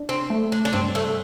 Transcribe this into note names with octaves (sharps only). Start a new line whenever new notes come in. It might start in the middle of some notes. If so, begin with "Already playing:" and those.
Already playing: D4
C4
A3
D4
D4
G2 C4
A3